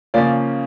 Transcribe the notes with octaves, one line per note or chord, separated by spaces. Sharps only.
C#3 F3 A#3 C#4 D5